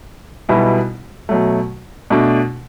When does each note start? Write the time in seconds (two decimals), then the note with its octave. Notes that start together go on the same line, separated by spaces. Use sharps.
0.49 B1 B2 G3 B3 E4
1.29 B2 F#3 A3
2.10 B2 A3 D4